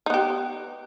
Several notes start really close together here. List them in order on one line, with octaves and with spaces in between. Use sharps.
D#4 B3 G4